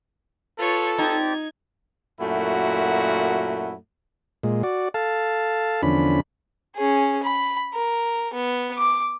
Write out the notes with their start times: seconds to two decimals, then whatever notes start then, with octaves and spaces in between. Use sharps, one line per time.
0.58 F4 A4 B4 C#5
0.98 C4 D#4 G4 D5 G#6
2.21 F#2 A#2 A3 E4 F#4
4.43 A#2 G#3
4.63 F#4 D5
4.94 A4 F5 A5
5.83 E2 D3 F3 C#4 D4 B5
6.76 C#4 G#4
7.23 B5
7.74 A#4
8.34 B3
8.78 D6